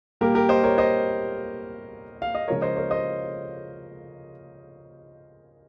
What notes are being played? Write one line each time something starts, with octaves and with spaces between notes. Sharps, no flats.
A#2 G3 A#3 G4 A#4
G4 A#4
C5 D#5
A#4 C#5
C5 D#5
F5
D#5
C#3 F3 G#3 A#4 C#5
C5 D#5
A#4 C#5
C5 D#5